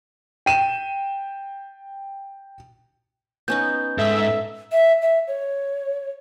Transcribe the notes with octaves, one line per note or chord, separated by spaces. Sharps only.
G5 D#7 E7
B3 C#4 D#4 G6
G#2 A4 E5
E5
E5
C#5